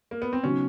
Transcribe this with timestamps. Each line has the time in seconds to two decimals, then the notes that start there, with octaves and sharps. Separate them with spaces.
0.11 A#3
0.22 B3
0.33 C4
0.44 C#3 F#3 B3 C#4 D#4 F#4